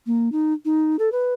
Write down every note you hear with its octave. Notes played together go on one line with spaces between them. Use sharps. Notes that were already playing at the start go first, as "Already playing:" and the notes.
A#3
D#4
D#4
A4
B4